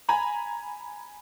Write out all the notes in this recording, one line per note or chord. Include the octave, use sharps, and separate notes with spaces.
G#5 A#5 B5